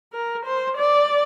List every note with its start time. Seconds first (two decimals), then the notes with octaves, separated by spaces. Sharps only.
0.13 A#4
0.46 C5
0.77 D5